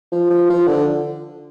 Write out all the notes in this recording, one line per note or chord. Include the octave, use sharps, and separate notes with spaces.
F3
F3
F3
D3